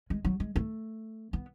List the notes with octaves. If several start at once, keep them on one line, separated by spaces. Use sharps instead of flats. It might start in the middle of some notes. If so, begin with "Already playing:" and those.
G#3
F#3
G#3
A3
B3